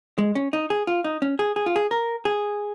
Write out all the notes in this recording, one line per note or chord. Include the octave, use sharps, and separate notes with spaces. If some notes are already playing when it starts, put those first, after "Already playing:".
G#3
C#4
D#4
G#4
F4
D#4
C#4
G#4
G#4
F4
G#4
A#4
G#4